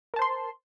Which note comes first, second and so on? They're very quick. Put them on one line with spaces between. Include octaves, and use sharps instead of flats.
A#4 A5 C5 C6